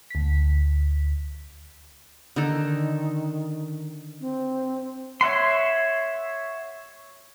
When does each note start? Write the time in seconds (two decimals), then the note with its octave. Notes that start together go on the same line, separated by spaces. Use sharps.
0.10 D2 B6
2.36 D3 D#3 D#4 A4
4.21 C4
5.21 C#5 E5 F#5 C6